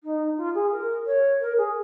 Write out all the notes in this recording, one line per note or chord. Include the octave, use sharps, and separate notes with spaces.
D#4
F4
G#4
A#4
C#5
A#4
G#4